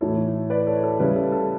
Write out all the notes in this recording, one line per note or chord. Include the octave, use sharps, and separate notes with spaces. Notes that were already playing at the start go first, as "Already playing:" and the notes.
A2 E3 A3 E4 A4 C#5
B4 D5
A4 C#5
A4
C#3 G3 C#4 E4 B4
A4
A4